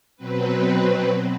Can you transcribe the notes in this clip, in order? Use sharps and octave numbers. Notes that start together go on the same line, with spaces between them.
B2 F#3 C4 B4